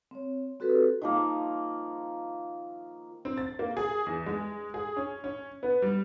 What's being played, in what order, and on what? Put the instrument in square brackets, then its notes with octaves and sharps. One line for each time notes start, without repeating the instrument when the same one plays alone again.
[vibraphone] C4 C#5
C4 F#4 G4 A4 B4
[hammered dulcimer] D#3 F3 A#3
[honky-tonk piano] C4
A6
A#3
G#4
E2
G#3
G#4
C#4
C#4
B3
G3